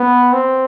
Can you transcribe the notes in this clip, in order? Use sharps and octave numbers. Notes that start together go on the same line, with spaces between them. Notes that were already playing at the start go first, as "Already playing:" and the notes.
Already playing: B3
C4